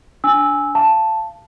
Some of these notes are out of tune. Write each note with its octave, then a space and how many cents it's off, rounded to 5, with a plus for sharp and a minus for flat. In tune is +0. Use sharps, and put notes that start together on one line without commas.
D4 -15 G#5 +0 E6 -10
F5 -25 A5 +0